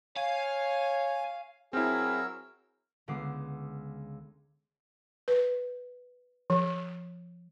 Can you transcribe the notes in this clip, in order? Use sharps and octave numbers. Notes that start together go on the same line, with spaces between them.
C#5 F5 G#5
F#3 C4 E4 G#4 A#4 E6
C#2 D3 B3 D6 C7
B4
F3